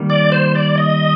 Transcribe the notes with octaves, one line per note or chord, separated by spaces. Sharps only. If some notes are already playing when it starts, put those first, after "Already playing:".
Already playing: D#3 G3 A#3
D5
C5
D5
D#5